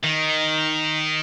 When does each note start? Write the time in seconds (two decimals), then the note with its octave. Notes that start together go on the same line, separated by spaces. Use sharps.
0.03 D#3